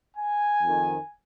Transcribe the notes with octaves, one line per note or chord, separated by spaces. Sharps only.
G#5
F2 D#3